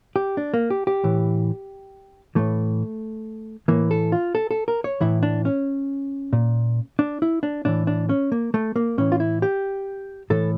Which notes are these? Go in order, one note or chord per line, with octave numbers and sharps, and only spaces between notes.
G4
D4
A#3
G4
G4
A2 E3
A2 E3 A3
A2 E3 A#3
A4
F4
A4
A4
A#4
C#5
A2 E3 E4
D4
C#4
A#2
D4
E4
D4
A2 E3 D4
D4
C#4
A#3
A3
A#3
A2 E3 C#4
F4
E4
G4
A2 E3 A4